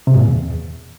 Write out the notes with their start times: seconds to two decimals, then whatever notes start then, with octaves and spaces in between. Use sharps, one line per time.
0.07 C3
0.14 G#2
0.20 A#2
0.27 E2